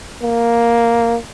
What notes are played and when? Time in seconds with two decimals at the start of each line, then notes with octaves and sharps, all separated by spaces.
0.23 A#3